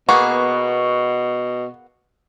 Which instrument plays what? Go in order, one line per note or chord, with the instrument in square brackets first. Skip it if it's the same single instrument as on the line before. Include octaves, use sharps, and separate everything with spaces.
[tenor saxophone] B2 [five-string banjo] A#3 B3 G#4 [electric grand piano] C#6